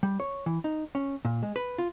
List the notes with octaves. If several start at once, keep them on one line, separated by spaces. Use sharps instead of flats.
G3
C#5
E3
D#4
C#4
A#2
G#3
B4
F4